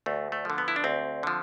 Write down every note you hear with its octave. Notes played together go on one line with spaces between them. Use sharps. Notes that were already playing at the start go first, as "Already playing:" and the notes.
D2 A3
A3
D3 F3
B3
E4
D4
D2 C4
D3 F3